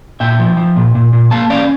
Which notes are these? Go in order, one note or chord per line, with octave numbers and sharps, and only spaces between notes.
A#2 E5 G5
F3
F3
A#2
A#2
A#2
A#3 F5 A5
C#4 D5 F5